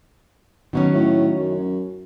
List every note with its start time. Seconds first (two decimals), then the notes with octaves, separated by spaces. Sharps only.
0.73 B2 D#3 F#3 C#4
0.93 A2
1.38 F#2